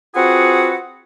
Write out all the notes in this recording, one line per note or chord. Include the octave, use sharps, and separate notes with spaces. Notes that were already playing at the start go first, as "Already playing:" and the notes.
C4 F4 F#4 G#4 B4 F#5